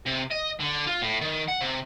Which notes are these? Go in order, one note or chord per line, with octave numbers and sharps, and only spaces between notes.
C3
D#5
D3
F4
A2
D#3
F#5
C3